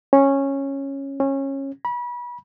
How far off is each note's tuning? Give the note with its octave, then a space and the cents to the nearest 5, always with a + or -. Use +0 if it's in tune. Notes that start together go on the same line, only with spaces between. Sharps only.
C#4 -10
C#4 -20
B5 -30